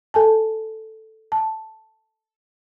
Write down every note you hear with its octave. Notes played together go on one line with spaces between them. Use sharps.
A4 G#5 A5
A5